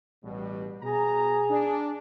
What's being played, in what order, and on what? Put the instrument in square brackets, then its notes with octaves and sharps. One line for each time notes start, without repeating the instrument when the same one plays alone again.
[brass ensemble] A1 B2 G3
[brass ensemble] B2 A#5 [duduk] G#4
[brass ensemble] D4